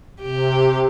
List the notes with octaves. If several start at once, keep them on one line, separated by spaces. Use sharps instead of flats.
C3 G4